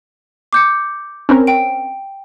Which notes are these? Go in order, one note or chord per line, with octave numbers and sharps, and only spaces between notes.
D6 G6 C#7
C4 C#4 A#4
G5 D7